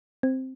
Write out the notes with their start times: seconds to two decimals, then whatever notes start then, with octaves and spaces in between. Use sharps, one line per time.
0.23 C4